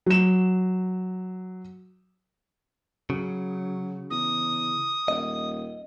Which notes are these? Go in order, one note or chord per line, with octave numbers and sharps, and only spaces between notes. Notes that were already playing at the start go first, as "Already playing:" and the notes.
F#3 E7
C#3 F#3
E2 D#6
D#1 D#5